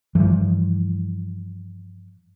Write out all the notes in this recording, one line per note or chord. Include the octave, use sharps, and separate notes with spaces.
G2 E3 F3